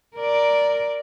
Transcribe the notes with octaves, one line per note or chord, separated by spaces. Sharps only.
A#4 D5